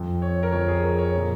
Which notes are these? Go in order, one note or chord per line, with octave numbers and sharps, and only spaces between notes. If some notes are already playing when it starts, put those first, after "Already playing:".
Already playing: F2 F3
C#5
A#4
F2 F3 C#5
G#4
A#4
C#5
A#2 F3